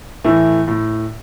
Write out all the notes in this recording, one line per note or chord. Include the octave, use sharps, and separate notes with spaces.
A2 E3 A3
A2